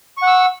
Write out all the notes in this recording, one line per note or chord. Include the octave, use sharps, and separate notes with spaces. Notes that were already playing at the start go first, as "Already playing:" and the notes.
F#5 C#6 E6